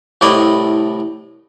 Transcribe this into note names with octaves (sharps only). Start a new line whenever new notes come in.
C2 A2 A3 E4 D5 D#5